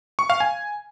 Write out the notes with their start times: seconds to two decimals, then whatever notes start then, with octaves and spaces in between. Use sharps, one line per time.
0.19 C#6
0.30 F5
0.40 G#5